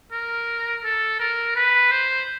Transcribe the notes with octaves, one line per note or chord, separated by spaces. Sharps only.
A#4
A4
A#4
B4
C5